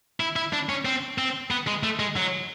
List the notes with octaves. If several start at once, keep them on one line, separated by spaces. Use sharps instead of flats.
E4
E4
D4
C#4
C4
C4
B3
G#3
A3
G#3
F#3